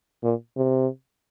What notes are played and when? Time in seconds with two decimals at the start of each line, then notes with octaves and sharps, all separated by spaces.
0.23 A#2
0.57 C3